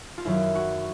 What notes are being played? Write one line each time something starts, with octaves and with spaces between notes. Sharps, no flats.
F4
F#2 D#3 F#3 E4
F#4